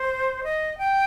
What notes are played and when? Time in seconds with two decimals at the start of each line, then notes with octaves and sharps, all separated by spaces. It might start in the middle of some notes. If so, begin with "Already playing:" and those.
Already playing: C5
0.44 D#5
0.78 G5